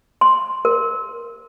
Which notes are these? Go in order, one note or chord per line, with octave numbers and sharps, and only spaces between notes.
C6
A#4